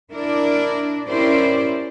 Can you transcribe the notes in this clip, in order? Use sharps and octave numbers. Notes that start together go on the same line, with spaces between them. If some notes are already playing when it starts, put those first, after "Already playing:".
D4 E4 A#4 D5
C#4 E4 G4 A#4 C5 D5